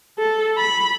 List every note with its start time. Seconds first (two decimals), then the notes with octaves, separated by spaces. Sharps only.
0.19 A4
0.57 B5